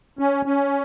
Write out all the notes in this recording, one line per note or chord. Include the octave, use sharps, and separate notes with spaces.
C#4
C#4